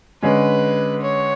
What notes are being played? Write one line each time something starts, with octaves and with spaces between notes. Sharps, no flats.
D3 G#3 C#4 B4
C#5